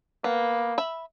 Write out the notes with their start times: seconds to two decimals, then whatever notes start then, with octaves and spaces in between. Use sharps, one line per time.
0.24 A#3 B3
0.78 E5 B5